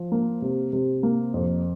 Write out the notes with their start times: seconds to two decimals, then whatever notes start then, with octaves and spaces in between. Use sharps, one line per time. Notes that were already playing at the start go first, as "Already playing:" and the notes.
Already playing: F3
0.12 A#3
0.42 C3
0.73 C3
1.03 A#3
1.34 F2